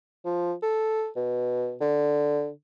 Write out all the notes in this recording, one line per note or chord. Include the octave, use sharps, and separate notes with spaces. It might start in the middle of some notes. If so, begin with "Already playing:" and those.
F3
A4
B2
D3